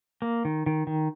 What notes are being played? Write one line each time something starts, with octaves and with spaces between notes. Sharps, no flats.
A#3
D#3
D#3
D#3